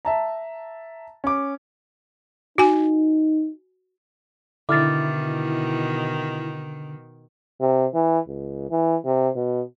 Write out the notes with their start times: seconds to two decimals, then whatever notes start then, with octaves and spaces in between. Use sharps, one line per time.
0.05 E5 A5 A#5
1.24 C#4 D6
2.58 D#4 F#4 G#5
4.69 B2 D3 D#3 E4 D6 F6 A6
7.61 C3
7.94 E3
8.28 C#2
8.71 E3
9.05 C3
9.36 B2